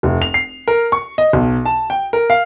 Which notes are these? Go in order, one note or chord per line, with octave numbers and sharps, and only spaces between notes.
F1
F7
C7
A#4
C#6
D#5
B1
A5
G5
A#4
F5